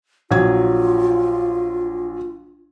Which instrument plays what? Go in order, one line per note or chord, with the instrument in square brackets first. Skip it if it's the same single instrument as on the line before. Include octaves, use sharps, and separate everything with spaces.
[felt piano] A#1 F#3 G#6 [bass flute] F4